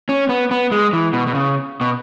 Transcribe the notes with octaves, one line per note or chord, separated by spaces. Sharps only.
C#4
B3
B3
G#3
E3
B2
B2
C#3
B2